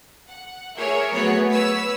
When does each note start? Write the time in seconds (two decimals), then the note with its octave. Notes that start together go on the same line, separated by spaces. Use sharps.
0.29 F#5
0.77 G#4 A#4 C#5 E5
1.12 F#3 A3 B3 F#4 G#4 C#5
1.49 B4 C#5 E6 B6